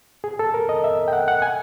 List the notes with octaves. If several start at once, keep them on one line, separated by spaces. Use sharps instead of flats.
G#4
A4
A#4
D#5
E5
G5
F#5
F#5
G#5